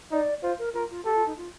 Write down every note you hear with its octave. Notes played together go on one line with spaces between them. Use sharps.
D#4 D5
F4 C5
A#4
F4 A#4
F4
G4 A4
F4
D#4
F4